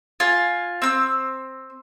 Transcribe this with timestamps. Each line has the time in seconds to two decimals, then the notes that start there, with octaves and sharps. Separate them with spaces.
0.20 F4 G#5
0.82 C4 E6